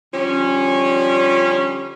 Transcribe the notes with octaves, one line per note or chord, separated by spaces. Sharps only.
D3 F3 G3 C#4